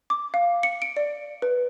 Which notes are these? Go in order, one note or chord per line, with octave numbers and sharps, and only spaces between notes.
D6
F5
C#7
D7
D5
B4